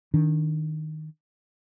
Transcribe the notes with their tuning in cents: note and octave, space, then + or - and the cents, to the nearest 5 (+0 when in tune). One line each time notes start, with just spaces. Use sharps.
D#3 +0 D4 -15